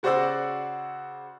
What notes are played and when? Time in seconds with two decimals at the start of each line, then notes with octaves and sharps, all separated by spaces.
0.03 C#3 F#4 C5 D5 F#5 E6